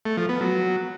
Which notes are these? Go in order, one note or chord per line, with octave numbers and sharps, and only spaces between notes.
A3
F3
B3
F#3